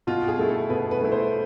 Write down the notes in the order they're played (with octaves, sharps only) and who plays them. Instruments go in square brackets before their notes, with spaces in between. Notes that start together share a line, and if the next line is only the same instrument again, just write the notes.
[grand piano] B2 [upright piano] F4
[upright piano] G#4
[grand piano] A3 E4
[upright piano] A4
[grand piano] B2 [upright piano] B4
[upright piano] B4
[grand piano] A3 E4
[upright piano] C5